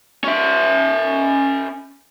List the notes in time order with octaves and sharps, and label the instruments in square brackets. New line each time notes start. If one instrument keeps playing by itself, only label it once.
[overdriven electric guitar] C#4 E5